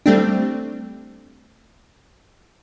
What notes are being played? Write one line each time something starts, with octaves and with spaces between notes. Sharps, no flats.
G3 A3 C4 D4